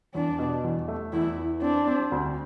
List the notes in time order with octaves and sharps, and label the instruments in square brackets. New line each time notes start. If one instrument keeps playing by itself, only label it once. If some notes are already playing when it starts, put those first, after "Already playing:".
[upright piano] E2 [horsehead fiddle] D4
[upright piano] B2
E2
A3
[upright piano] E2 [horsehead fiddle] E4
[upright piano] E3
[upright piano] C4 [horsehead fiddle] D4
[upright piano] C4
D2